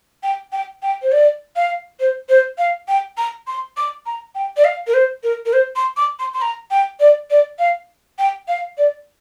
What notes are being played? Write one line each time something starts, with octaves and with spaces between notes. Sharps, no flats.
G5
G5
G5
C5
D5
F5
C5
C5
F5
G5
A#5
C6
D6
A#5
G5
D5
F5
A#4
C5
A#4
A#4
C5
C6
D6
C6
C6
A#5
G5
D5
D5
F5
G5
F5
D5